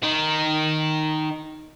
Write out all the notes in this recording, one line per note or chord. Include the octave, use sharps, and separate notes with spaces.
D#3 D#4